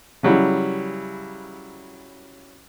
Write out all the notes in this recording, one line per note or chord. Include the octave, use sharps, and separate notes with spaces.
C#3 F#3 G3 E4